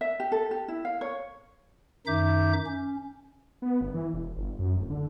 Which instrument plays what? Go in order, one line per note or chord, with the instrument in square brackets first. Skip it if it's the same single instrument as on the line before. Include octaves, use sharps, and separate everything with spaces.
[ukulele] E5
G4
A4
G4
E4
F5
C#5
[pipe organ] F#2 D#3 D#4 E5 D6 G6
C#4
[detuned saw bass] B3
G1
E3
E1
G1
F#2
D1
D3